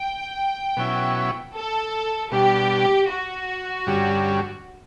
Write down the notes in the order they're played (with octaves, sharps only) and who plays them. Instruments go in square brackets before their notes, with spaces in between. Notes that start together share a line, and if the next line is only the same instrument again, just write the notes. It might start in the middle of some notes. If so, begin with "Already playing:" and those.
Already playing: [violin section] G5
[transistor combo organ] B2 F#3 C#4 E4
[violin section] A4
[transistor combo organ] B2 G3 D4 [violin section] G4
[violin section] F#4
[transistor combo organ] G2 D3 G3 C#4